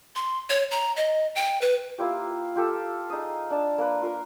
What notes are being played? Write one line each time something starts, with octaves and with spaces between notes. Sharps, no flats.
C6
C#5
A#5
D#5
G5
B4
A#3 E4 F4 G4
F4 G4 A4
D#4 G#4 D#6
D4 A5
A#3 B4
F4 A#4